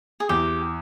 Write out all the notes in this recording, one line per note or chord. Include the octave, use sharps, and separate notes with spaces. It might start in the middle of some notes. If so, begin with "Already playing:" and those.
G#4
E2 G4